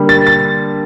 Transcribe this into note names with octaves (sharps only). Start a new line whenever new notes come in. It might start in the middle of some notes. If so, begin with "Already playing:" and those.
Already playing: D3 G3 A#3
A6
A6